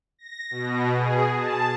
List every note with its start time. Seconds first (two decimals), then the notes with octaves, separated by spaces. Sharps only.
0.19 A#6
0.51 B2
0.96 G#4
1.33 A5